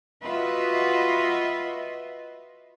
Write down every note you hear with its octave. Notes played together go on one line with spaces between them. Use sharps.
F4 F#4 B4 D#5 E5